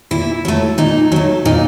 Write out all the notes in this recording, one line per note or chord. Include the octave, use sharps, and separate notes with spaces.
A#2 E4
F#3 A3
A#2 D#4
F#3 A3
A#2 D#4